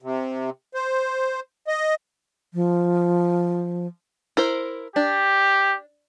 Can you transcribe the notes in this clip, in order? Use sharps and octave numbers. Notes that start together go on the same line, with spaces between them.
C3
C5
D#5
F3
E4 A#4 C5
D4 G4